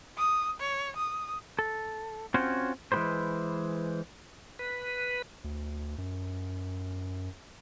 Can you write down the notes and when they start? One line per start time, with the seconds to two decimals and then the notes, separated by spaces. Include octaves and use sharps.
0.18 D#6
0.60 C#5
0.96 D#6
1.59 A4
2.34 C4 C#4 F4 F#4 C5 C#5
2.92 E3 G#3 B3 G4 B4 C5
4.59 B4
5.44 D2
5.98 F#2